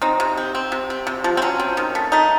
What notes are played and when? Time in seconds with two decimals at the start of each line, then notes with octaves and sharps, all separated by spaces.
0.02 C4 D#4
0.20 C3
0.37 C4
0.55 C4
0.72 C3
0.90 C4
1.07 C3
1.24 F3
1.37 C4
1.42 F#3 C#4
1.60 C4
1.77 D#3
1.95 A3
2.12 A3 D#4